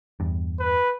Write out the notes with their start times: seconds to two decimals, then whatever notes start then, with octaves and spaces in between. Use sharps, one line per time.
0.20 E2 G2
0.59 B4